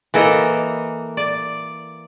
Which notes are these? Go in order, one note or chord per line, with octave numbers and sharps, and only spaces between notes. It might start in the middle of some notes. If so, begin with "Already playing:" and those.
E3 A#3 A4 D#5
D5